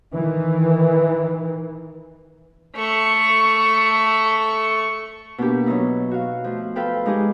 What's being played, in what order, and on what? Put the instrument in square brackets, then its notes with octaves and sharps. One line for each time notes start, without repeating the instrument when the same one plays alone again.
[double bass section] D#3 E3
[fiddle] A3 C#6
[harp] B2 A#3 D4 G4
F#3 B3 D#4 E4
F#4 F5
F3 A3
F4 A4 B4 F5 G5
G#3 D#4 F4 G4 G#4